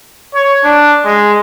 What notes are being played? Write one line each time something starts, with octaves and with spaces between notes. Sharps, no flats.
C#5
D4
G#3